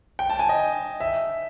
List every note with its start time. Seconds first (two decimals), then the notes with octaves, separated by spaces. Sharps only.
0.19 G5
0.30 A5
0.39 G#5
0.49 D#5
1.00 E5